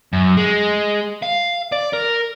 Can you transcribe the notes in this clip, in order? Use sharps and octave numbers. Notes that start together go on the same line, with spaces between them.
F#2
G#3
F5
D5
A#4